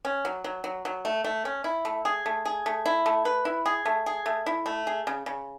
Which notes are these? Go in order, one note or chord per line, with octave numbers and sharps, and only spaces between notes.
C#4
F#3
F#3
F#3
F#3
A3
A3
C#4
E4
A3
G#4
A3
G#4
A3
E4
A3
B4
E4
G#4
A3
G#4
A3
E4
A3
G#4
C#3
C#3